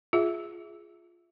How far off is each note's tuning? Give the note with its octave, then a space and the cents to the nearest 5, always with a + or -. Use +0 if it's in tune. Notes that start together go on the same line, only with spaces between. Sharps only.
F4 -10 G#4 +0 E5 +0